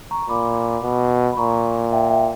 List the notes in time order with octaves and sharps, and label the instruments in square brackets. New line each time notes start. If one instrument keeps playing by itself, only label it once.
[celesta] A#5 C#6
[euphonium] A#2 [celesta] B5 D6
[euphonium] B2
[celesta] B5
[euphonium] A#2 [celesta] A#5 C#6
[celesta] E5 G5
E5 G5